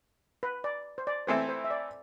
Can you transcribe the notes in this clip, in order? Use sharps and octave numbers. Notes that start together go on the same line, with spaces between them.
B4
D5
C5
D5
E3 A3 C4 E4 A4 C5
C5
E5
D5